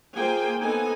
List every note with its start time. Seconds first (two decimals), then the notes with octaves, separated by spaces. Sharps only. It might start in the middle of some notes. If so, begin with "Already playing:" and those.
0.15 A#3 F4 G#4 C5 G5 G#5
0.60 B3 C4 D#4 A4 G#5